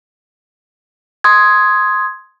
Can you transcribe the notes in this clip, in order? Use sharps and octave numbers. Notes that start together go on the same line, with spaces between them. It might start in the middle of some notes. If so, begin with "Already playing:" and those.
C6 D#6 G#6